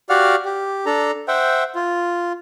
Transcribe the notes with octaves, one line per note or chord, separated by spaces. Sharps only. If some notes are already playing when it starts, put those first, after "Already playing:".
F#4 G4 D5 F5 F#5 F6
G4
D4 A4 A#5
C5 E5 F#5 G5
F4